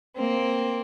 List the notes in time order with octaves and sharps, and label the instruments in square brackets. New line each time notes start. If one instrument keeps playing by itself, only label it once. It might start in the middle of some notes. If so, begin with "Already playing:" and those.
[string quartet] A#3 C4